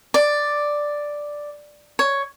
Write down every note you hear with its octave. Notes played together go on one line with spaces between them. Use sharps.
D5
C#5